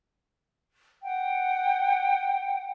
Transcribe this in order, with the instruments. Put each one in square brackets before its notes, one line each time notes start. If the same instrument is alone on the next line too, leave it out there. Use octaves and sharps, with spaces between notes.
[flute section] F#5 G5